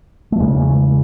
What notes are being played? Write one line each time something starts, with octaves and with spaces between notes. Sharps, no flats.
A3
E2 C#3 G#3